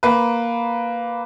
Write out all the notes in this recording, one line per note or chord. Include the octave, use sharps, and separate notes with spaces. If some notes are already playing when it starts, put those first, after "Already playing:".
A#3 B4